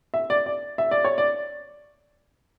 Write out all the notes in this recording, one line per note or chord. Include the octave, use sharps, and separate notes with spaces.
E5
D5
D5
E5
D5
C#5
D5